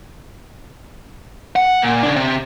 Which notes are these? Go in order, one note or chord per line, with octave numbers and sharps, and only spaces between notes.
F#5
A#2
C#3 D4
C3